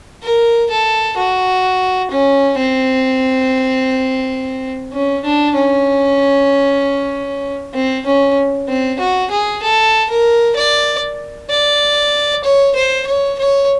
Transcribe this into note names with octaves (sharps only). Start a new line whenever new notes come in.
A#4
A4
F#4
C#4
C4
C#4
D4
C#4
C4
C#4
C4
F#4
G#4
A4
A#4
D5
D5
C#5
C5
C#5
C#5